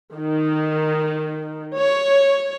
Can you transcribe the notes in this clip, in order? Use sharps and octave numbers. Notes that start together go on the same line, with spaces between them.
D#3
C#5